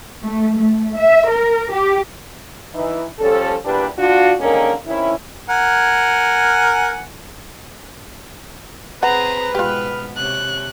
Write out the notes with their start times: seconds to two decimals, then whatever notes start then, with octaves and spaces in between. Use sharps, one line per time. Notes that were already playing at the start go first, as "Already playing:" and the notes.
0.23 A3
0.57 A3
0.97 E5
1.29 A#4
1.72 G4
2.74 E3 D#4
3.19 F3 G3 C#4 A4
3.64 E2 A#2 G3 D4 G4 B4
3.98 D4 F4 F#4
4.39 D3 D#3 G#3 A#3 C#4 A#4
4.86 C3 D#3 C#4 E4
5.49 A#4 F#5 G#5
9.03 C4 G#4 B4 C5 F#5 A#5
9.55 G#2 B2 B3 F4 G4 F6
10.17 C3 C#5 F#6